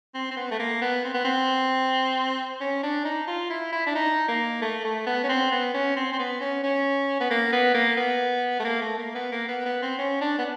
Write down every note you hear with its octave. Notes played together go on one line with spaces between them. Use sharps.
C4
C4
B3
A3
A#3
B3
C4
B3
C4
C#4
D4
D#4
F4
E4
E4
D4
D#4
A#3
A3
A3
B3
C#4
C4
B3
C#4
C4
C4
B3
C#4
C#4
B3
A#3
B3
A#3
B3
A3
A#3
A3
A#3
B3
A#3
B3
B3
C4
C#4
D4
B3